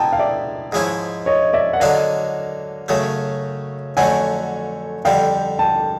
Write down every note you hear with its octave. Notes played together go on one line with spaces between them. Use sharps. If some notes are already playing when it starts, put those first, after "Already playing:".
Already playing: B2 G#3 E4 G5 A5 A#5
F5
D5 E5
G#2 F3 G#3 C#4 E4
C#5 D#5
D5 E5
F#5
D3 F#3 A#3 D4 D#5 F5
F#2 C#3 F#3 A3
F2 D3 F#3 A3 C#4 F#5 G#5
F2 D3 G3 F5 G5
G5 A5